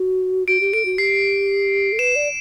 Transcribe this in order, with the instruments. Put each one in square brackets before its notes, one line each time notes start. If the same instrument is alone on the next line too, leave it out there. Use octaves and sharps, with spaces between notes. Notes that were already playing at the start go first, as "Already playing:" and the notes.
Already playing: [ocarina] F#4
[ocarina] F#4 [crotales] D7
[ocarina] G4
[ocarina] A4 [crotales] D7
[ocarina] F#4
[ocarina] G4 [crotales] C7
[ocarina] A4
[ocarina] B4 [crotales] E7
[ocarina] D5